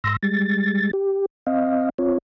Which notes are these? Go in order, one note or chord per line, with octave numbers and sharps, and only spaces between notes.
G#2 C6 E6 A#6
G3 G#3 A6
G4
C4 D#5 F5
C4 F4 C#5